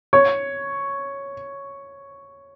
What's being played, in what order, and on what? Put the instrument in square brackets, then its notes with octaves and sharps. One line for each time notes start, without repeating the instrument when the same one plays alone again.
[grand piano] C#5